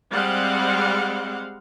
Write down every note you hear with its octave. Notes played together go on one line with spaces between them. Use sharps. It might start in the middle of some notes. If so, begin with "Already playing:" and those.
G3 G#3 C4 F5 F#5